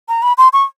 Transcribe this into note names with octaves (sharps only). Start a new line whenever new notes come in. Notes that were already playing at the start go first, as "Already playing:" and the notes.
A#5
B5
C6
C#6